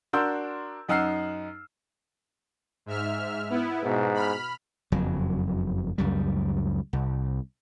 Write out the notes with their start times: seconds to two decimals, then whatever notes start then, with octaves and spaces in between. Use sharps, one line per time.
0.13 D4 F#4 A#4 C6 E6 G6
0.89 F#2 D#4 F#5 E6 F6 C7
2.86 G#2 E5 F6
3.50 B3 E4
3.83 G#2 B2
4.14 B5 F6
4.92 F#1 F2 F#3
5.98 C#2 F#2 G3
6.93 C2